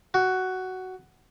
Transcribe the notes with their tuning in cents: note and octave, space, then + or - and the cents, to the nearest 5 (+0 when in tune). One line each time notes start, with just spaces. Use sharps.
F#4 +10